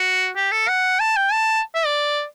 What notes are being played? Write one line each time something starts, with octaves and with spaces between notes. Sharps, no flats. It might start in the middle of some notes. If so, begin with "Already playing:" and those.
Already playing: F#4
G4
A4
F#5
A5
G5
A5
E5
D5